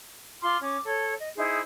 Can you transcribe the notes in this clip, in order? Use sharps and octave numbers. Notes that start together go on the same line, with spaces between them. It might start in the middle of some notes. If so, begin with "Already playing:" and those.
F4 C6 D6 F6
C#4 D6
A4 C#5
D#5
D#4 E4 G#4 C5